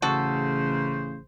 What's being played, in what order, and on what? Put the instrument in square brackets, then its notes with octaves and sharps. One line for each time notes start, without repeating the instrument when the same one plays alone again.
[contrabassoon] A1 [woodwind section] C#3 [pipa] F#4 A4 [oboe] C5